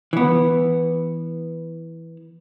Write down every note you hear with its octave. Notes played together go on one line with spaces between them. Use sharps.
E3 B3